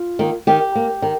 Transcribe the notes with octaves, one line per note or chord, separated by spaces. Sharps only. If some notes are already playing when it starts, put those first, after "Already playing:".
Already playing: F4
D#3 A#3
D#3 G4
A#3
D#3